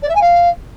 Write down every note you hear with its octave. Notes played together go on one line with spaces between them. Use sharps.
D5
E5
G#5
F5